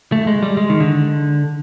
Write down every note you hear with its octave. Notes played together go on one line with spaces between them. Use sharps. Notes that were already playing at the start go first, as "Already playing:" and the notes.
A3
G#3
G3
G#3
D#3
D3